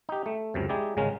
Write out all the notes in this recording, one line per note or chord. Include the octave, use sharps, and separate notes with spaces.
D#4 G4
A3
C#2 F#2 C3
G#3 D#4 E4 G4 G#4 D5
G#1 C#3 G#3 C#4 A#4